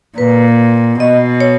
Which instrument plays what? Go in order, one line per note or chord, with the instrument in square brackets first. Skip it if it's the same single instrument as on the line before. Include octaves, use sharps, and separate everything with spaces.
[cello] A#2 [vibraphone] B4
[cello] B2 [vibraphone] D#5
[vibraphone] C#5